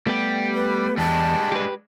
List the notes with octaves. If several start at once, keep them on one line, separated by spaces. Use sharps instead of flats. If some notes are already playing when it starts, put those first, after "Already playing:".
G3 A3 B3 G4
B4
E2 G3 G#3 D4 A5
G4 B4